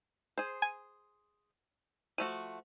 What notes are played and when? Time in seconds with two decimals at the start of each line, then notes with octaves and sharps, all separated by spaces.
0.37 G#4 C5
0.62 G#5
2.18 F3 A3 F#4 D#7